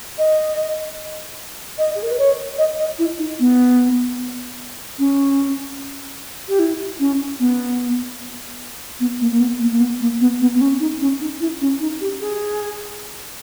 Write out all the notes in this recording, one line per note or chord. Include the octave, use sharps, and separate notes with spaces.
D#5
D#5
G#4
A#4
B4
C#5
D#5
D#5
E4
D#4
B3
C#4
G4
E4
C#4
B3
B3
A#3
A#3
B3
A#3
A#3
B3
A#3
B3
B3
B3
C#4
D#4
C#4
D#4
E4
C#4
D#4
G4
G#4